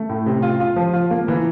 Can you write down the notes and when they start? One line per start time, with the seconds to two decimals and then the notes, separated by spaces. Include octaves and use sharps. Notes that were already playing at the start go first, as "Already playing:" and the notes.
Already playing: A3
0.09 A2
0.26 C3
0.42 F4
0.60 F4
0.76 F3
0.93 F4
1.11 A#3
1.28 E3